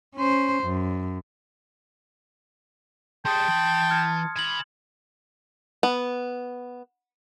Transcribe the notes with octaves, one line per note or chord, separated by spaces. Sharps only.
C#4 C5
F#2
G3 G#4 G5 A5 C6 D#6
E3 B5
F6 G#6 C#7
G#5 B5 G#6 F#7
B3